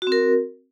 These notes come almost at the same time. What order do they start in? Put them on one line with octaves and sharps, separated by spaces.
F#4 C4 A#4